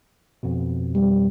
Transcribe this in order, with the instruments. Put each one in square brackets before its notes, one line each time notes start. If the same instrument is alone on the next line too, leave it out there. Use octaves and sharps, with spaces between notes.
[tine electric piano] F2 B2
[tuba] G3